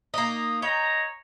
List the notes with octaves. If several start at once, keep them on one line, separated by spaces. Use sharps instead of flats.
A#3 D#4
C#5 D#5 G5 A#5